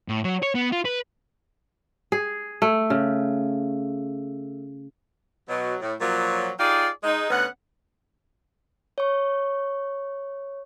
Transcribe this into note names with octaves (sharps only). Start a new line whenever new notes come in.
A2
F#3
C#5
B3
F4
B4
G#4
A3
C#3
B2 F#3
A2
A#2 F3 F#3
D#4 F4 G4 G#4 D5
G#3 D#4
D2 B3 C#4 F#5
C#5 C#6